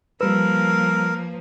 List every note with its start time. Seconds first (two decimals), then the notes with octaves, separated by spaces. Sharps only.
0.21 F3 G3 A#3 A#4 B4 E6